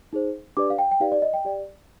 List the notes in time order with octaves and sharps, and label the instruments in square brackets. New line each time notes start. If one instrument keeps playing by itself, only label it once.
[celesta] D#4 G#4 C5
D4 G4 B4 D5 D6
F5
G5
G5
D#4 G4 B4 D5 F5
D5
D#5
G5
G4 D5